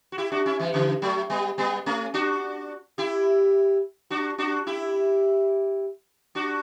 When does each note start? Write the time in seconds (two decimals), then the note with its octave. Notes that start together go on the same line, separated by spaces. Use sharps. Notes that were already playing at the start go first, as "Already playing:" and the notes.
0.12 F#4
0.18 E4 G4
0.32 D4 F#4
0.46 C#4 E4
0.59 E3 G3
0.74 C#3 E3
1.02 F#3 A3
1.30 G3 B3
1.58 G3 B3
1.86 A3 C#4
2.14 D4 F#4
2.98 E4 G4
4.10 D4 F#4
4.38 D4 F#4
4.67 E4 G4
6.35 D4 F#4